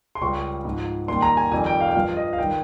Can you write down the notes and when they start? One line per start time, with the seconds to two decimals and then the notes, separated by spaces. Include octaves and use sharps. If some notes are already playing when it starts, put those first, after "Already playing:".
0.15 C6
0.21 C#2 C#3 G3 C#6
0.65 G#2 F3
1.08 D#2 D#3 G3 C6
1.22 A#5
1.37 G#5
1.51 F2 D#3 G3 G#5
1.66 G5
1.81 F5
1.89 G5
1.95 G2 F3 F5
2.17 D#5
2.33 F5
2.38 D#3 G3 G5